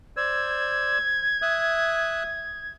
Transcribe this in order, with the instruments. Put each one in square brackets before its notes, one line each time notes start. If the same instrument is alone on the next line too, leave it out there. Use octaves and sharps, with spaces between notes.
[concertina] C5 D5 E6 [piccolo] G#6
[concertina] E5 D#6 F#6